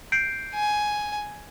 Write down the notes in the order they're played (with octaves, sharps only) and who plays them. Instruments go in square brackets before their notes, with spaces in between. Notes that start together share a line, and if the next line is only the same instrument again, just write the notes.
[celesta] G6 C7 D7
[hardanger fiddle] G#5